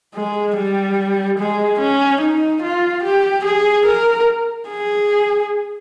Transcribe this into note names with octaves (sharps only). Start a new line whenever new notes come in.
G#3
G3
G#3
C#4
D#4
F4
G4
G#4
A#4
G#4